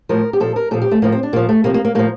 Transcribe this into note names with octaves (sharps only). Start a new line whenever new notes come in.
A2 F3 A#4
G4
A#2 F3 A4
A#4
A#2 F3 A4
G4
A3
A2 F3 A#3
C4
D4
A#2 F3 A#3
A3
C3 F3 A#3
A#3
A#3
A2 F3 A#3